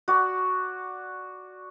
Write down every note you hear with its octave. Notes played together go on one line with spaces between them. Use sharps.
F#4 D5